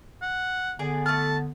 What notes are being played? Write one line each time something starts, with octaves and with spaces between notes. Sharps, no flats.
F#5
D3 B3 G#4 D5 G#5
A3 A5 F6